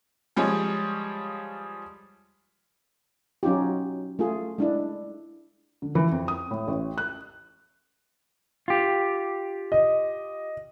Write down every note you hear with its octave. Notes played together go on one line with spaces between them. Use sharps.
F3 G3 G#3 G#4 C#5
F#3 C#4 D#4 F4 G4
A3 F4 G#4
G#3 D4 E4
D3
E3
F2
D#6
A2
A1
F#6
F4 G4
D#5